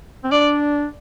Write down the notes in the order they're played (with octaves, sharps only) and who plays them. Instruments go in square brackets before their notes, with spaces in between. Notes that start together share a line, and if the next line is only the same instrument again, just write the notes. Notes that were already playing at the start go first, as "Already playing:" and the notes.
[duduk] C4
[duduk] D4 [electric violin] D5